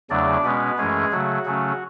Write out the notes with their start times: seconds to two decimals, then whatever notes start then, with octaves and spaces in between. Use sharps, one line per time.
0.10 E2 C#3 F#3 A3 D4 D5
0.43 B2 G#3 B3 C#4 B4
0.78 F#2 E3 G#3 A3 C#4 G#4
1.12 C#3 F#3 A3 F#4
1.45 C#3 F#3 A3 C#4